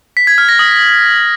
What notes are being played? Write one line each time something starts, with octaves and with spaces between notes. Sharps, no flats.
B6
G#6
F6
A#6
D#6